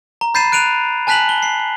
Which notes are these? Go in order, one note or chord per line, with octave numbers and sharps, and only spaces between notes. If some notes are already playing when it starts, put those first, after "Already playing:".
A#5
B5 G6 A6 C7 D#7 E7
F#6 D7 D#7 F7
G#5 A5 F#6 B6 F7 F#7
G7
C7